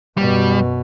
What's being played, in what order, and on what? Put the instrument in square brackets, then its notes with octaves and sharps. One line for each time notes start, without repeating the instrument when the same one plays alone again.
[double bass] F#2 B2 [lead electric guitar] G3